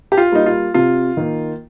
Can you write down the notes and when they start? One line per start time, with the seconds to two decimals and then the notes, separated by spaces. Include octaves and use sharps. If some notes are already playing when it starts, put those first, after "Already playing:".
0.12 G4
0.17 F4
0.32 G3 A#3 D#4
0.46 F4
0.74 C3 F4
1.17 D#3 A#3